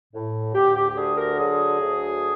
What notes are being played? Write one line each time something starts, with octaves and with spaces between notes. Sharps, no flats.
A2
D2 G4
G4
G4
D3 G#4
A#4
F#3 G#4
D2